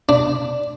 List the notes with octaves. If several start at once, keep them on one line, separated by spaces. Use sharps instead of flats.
D4